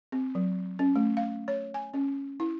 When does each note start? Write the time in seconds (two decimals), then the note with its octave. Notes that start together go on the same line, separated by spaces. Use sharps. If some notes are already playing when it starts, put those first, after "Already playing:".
0.12 C4
0.35 F#3
0.79 C#4
0.96 A3
1.17 F5
1.48 C#5
1.74 G#5
1.94 C#4
2.40 E4